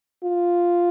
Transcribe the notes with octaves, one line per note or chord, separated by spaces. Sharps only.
F4